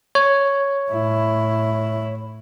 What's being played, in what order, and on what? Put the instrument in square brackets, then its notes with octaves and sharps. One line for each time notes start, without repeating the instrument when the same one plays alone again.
[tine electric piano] C#5
[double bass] A2 E4